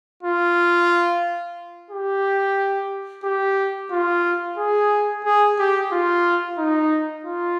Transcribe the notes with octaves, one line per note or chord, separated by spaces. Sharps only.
F4
G4
G4
F4
G#4
G#4
G4
F4
D#4
F4